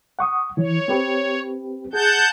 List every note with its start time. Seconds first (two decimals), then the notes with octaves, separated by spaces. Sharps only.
0.19 F#5 C#6 D#6
0.57 E3 C#5
0.88 C4 G4 B4
1.93 G#4 F#5 A5 G6